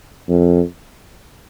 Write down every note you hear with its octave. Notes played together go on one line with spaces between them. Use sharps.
F2